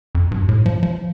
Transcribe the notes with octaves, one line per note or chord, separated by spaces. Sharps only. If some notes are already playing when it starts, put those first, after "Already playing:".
F2
G2
A2
F3
F3